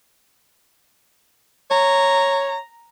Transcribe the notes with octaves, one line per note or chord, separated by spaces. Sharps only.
C#5 A#5